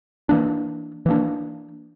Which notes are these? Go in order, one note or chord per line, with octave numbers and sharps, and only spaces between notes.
E3 A#3 D4
E3 A#3 D4